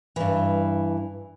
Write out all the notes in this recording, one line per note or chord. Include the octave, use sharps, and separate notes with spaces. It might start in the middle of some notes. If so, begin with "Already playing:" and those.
G2 E3